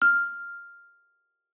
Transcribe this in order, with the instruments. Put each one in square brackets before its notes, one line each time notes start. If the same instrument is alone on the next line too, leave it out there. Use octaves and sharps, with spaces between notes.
[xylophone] F6